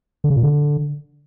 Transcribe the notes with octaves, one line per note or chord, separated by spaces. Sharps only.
D3
C#3
A#2
D3